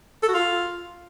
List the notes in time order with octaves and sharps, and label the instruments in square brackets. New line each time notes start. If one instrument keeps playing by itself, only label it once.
[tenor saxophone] A4
F#4
F4